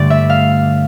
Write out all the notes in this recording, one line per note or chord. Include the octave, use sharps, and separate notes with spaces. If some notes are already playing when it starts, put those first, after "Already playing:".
Already playing: G2 D3 A3 D5
E5
F5